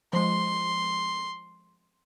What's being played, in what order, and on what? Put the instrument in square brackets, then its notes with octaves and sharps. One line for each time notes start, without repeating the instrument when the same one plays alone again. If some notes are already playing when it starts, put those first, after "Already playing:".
[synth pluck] F3 G#3 [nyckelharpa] C6